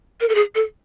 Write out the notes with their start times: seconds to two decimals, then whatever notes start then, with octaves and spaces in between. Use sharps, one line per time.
0.21 A#4
0.29 A4
0.35 G#4
0.55 A4